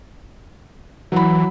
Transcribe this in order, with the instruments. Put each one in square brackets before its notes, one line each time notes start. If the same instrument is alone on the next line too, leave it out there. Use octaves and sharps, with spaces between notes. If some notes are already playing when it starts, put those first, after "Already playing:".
[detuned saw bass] E3 [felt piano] F#3 B5